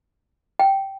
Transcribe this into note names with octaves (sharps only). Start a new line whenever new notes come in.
G5